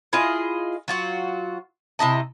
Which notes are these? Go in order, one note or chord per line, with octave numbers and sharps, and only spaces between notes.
E4 F4 G#4 D#5
F#3 F4 F#4
C3 E4 D#5 A5